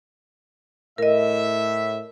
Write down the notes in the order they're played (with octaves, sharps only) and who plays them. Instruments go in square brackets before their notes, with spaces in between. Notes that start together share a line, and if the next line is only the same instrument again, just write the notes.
[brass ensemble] A2 E5 [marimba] A#4 D#5